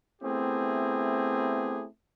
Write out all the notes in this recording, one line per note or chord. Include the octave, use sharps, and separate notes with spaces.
A3 B3 C4 E4 G4 G#4